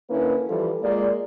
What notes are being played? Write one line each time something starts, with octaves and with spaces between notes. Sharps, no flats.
D3 A#3 C#4 E4 B4
E3 F3 G3 F4 A4
G#3 A#3 F4 D5